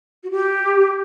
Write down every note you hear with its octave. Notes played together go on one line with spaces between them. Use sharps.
F#4
G4